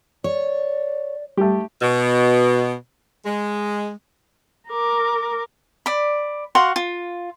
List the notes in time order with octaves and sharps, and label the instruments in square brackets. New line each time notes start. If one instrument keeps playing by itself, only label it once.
[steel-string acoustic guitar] C#5 [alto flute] D5
[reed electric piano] G3 [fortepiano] A3 G4
[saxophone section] B2
G#3
[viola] A#4 D6
[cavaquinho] D5 B5
F#4 F5 F#5 C6
F4